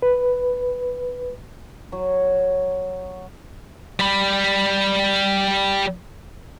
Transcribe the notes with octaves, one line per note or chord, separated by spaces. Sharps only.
B4
F#3
G3 B5